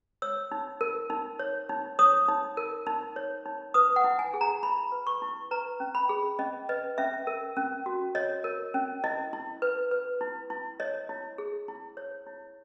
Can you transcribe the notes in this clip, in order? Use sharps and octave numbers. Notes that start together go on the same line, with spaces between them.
C#5 E6
D#4
A#4
D#4
C#5
D#4
C#5 D#6
D#4
A#4
D#4
C#5
D#4
B4 D#6
F#5
E4
G#5
G#4
A#5
E4 B5
B4
C#6
E4
B4 A#5
C#4
B5
G#4
C#4 D#5
B4 D#5
C#4 E5
A#4
C#4
F#4
C#5 D#5
A#4
C#4
E4 D#5
E4
B4
B4
E4
E4
C#5 D#5
E4
G#4
E4
C#5
E4